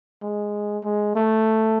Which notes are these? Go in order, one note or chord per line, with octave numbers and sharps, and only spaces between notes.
G#3
G#3
A3